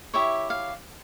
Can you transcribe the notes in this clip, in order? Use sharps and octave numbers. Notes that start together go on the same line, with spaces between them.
E4 G4 C#5 E5
F5